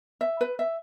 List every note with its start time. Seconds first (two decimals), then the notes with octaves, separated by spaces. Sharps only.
0.21 E5
0.41 B4
0.59 E5